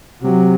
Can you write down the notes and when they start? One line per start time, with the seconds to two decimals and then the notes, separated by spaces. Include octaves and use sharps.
0.22 C3 F#3